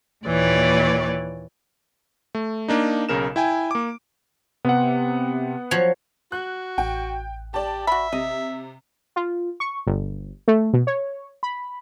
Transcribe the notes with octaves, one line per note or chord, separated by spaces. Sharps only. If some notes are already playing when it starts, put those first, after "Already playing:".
D#2 A#2 E3 C#5 D5
A3
A#3 D4 D#4
B1 C#3 A#4 E7
E4 G5 G#5
A#3 D6
C3 B3 F#5
F3 F#3 C#5
F#4 F#6
A1 G5
G4 D5 A5
F#4 E5 B5
C3 D#5
F4
C#6
G1
A3
B2
C#5
B5